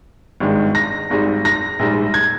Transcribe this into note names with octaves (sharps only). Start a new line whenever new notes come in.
G#1 G2 D#3 G#3
A#6
G#1 G#2 G3
A#6
A#1 G#2 G3
G#6